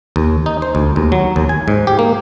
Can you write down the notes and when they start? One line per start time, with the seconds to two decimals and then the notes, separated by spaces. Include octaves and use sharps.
0.16 D#2
0.46 D#4
0.62 C5
0.75 D2
0.96 D#2
1.12 F#3
1.36 D#2
1.49 G#5
1.68 G#2
1.87 G4
1.99 A#3